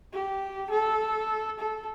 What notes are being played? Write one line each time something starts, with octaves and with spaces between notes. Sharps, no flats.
G4
A4
A4